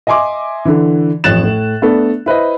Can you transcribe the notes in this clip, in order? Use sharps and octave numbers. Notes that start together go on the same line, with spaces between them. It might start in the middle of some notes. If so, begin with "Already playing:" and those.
D#5 E5 G#5 C6 D6
D3 E3
A1 F2 C#5 F#6 A6 E7
A2
A3 B3 D4 A4
E4 B4 C5 D#5